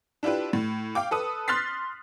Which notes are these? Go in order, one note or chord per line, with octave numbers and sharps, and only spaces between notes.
D4 E4 F4 G4 B4
A2
F5 G5 D6
A4 B4 D#6
C6 F6 F#6 A6 B6 C7